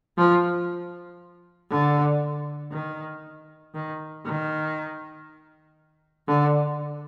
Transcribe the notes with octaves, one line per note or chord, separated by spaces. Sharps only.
F3
D3
D#3
D#3
D#3
D3